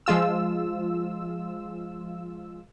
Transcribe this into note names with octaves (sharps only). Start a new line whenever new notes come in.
F3 G#3 F4 E6